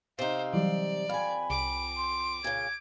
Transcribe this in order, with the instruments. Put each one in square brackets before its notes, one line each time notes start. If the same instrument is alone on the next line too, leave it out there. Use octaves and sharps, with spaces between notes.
[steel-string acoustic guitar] C3 D#4 [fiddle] C5 [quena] F5
[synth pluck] E3 F#3 G3 [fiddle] D5
[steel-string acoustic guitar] F2 G#5 [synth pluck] F5 [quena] B5
[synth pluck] C2 [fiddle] D6
[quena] C6
[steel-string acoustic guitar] A#2 C#3 [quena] G#6